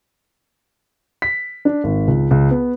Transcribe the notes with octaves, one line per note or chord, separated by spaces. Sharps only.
B6
D4
G#1
C#2
C#2
B3